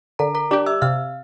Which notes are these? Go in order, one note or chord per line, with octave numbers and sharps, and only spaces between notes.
D3 A#4 A#5
A#4 A#5
G3 D4 G4 D5 D6
E5 E6
C3 F5 F6